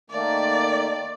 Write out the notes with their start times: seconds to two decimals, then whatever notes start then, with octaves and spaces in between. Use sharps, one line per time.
0.10 D#3 A3 A#3 D5